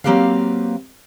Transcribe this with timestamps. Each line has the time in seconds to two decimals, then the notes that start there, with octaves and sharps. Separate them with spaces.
0.04 F#3 A#3 C4 G4 B4 F5